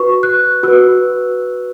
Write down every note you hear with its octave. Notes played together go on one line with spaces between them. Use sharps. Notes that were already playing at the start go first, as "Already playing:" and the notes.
Already playing: F#4 B4 C#6
F#6
F#4 B4 E6